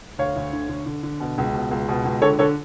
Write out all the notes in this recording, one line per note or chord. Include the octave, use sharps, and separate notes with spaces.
D2 C#5 F5
D2
D3
D3
D3
D3
B2
C#2
B2
C#2
B2
C#2
D3 A4 C#5
D3 A4 C#5